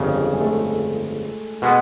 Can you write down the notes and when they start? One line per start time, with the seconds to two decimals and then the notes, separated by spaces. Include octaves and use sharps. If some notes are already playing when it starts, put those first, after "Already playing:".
Already playing: G1 F2 C#3
0.09 G#3
0.33 G#3
0.41 A3
1.62 B2 G#3 B3